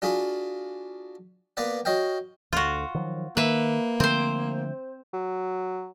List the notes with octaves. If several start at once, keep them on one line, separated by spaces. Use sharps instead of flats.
D4 F4 F#4 G#4 B5
A#3 B3 B4 D5 F#5
F#4 C#5 D#5 F5 G5
D2 D3 F4 F#4
D#3 F3 F#3
D#3 A#3 B4 E5
D3 F3 A3 C4 C5
F#3